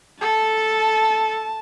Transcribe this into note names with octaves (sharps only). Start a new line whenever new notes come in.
A4 A5